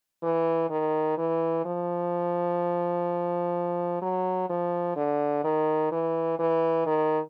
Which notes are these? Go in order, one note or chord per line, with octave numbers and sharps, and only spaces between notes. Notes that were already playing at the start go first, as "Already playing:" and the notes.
E3
D#3
E3
F3
F#3
F3
D3
D#3
E3
E3
D#3